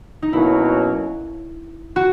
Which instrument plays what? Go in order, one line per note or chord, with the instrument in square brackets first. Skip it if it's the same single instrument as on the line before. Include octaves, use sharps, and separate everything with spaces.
[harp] D#4
[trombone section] B2 F#3 A#3 C#4 [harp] E4
[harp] F#4